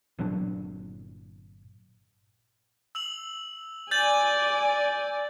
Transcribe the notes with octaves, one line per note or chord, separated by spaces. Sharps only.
G1 A#2 F#3 D4
E6 F7 F#7
D5 G#5 G6 A6 F#7